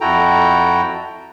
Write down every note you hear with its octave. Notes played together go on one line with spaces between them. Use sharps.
F2 E4 F#4 A4 G5 A#5